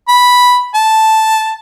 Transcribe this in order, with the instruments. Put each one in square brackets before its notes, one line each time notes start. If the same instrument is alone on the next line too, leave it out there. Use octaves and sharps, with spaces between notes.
[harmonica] B5
A5